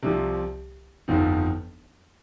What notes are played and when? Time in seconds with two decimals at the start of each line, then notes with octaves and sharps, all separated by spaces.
0.03 C2 C3 F3
1.08 G1 F2 F3 D#4